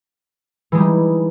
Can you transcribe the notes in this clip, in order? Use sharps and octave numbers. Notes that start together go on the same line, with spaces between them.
E3 G3 G#3 D#4